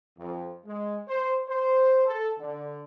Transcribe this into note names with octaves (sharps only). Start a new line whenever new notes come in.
F2
G#3
C5
C5
A4
D3